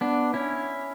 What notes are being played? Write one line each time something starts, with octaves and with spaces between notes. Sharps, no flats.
B3 D4
C#4 E4